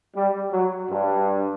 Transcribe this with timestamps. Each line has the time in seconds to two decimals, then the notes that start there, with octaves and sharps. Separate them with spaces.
0.15 G3
0.52 F#3
0.90 G2